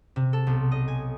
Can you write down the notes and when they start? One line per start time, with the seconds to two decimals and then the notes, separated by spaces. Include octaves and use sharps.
0.16 C3
0.33 A4
0.47 B1
0.72 D#5
0.88 G#5